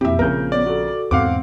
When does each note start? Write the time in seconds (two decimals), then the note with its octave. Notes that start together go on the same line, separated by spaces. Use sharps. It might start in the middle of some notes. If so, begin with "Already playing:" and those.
0.01 F2 B2 A#3 C4 E4 G4 E5
0.19 A#1 C#3 F3 A#3 C4 A#4 G6
0.52 B3 C#5 D5
0.66 F#4 A4
1.11 E2 G#2 B2 C4 F5 F#5 D6